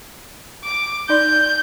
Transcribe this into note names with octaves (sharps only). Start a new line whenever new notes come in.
D6
D#4 D5 C6 G6